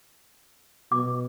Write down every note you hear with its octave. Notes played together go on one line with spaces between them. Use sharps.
B2 D6